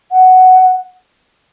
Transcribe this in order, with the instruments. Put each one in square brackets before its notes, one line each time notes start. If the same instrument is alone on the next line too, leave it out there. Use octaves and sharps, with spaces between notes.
[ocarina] F#5